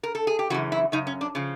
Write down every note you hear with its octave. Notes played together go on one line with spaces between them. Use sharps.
A#4
A4
G#4
G4
F#2 C#3 E3 F#4
E4
F#2 C#3 D#4
C#4
D4
C#3 F3